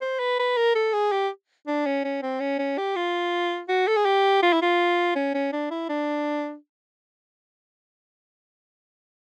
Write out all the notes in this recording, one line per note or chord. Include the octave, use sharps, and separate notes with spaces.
C5
B4
B4
A#4
A4
G#4
G4
D4
C#4
C#4
C4
C#4
C#4
G4
F4
F#4
A4
G#4
G4
F4
E4
F4
C#4
C#4
D4
E4
D4